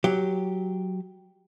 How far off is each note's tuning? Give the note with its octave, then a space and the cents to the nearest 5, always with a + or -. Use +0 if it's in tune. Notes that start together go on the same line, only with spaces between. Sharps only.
F#3 +0 G4 +0